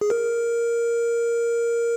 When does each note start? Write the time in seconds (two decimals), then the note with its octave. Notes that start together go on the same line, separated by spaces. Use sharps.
0.01 G#4
0.10 A#4